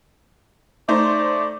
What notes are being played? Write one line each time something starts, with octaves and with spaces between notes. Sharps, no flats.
A3 D#4 C5 D5